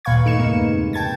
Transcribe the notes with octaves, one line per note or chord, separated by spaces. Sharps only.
D#2 A#2 B4 F5 C#6 G#6
G2 A3 D#4 C#7 E7
E2 C#3 G#3 A#3 D#4
C3
G5 A5 G#6 A6